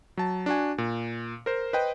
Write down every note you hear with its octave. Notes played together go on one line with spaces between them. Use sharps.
F#3 A5
D4 F#4 G#5
A#2
A#4 C5
B4 C5 D#5 G5